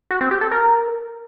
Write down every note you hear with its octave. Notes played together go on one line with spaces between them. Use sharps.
F#4
C4
G4
A4
A#4